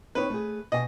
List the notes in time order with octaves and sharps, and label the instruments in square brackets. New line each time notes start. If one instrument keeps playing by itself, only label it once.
[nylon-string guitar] C4 D#4 C#5 [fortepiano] B4
[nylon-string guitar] A3 G#4
[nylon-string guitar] B2 G#5 [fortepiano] D#5